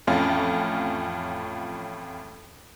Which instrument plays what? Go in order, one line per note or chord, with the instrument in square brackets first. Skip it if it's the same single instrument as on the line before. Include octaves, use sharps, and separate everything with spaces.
[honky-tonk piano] A1 F2 A2 C#4 F4 G#5